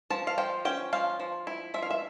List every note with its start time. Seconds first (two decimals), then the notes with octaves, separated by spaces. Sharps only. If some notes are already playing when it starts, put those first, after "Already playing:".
0.10 F3 A5
0.27 F5
0.38 F3 G5
0.65 C#4 G5
0.93 F3 F5
1.20 F3
1.47 E4
1.74 F3 E5
1.82 F5
1.91 E5